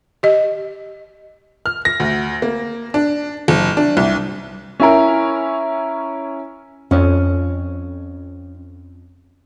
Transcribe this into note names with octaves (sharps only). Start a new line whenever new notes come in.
G4 D#5
F6
A#6
D2
A#3
D4
F#1
D4
C2
C#4 E4 A#4
F2 C#4